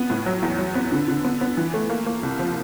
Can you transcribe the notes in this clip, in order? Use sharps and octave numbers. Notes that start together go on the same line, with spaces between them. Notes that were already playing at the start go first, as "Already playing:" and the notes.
Already playing: B3
A2
F#3
E2
F#3
B3
D3
D3
B3
B3
E3
A3
A#3
A#3
C2
F3